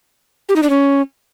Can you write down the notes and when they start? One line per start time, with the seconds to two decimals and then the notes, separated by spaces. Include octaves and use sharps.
0.49 G4
0.56 D#4
0.63 D4
0.70 C#4